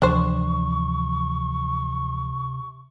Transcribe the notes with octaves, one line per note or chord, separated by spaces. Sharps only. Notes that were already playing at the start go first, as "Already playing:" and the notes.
D2 C3 E3 F3 D4 C5 C#6